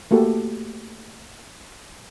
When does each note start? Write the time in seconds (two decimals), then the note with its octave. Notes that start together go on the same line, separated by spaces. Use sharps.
0.11 A3 A#3 F#4 G4 A4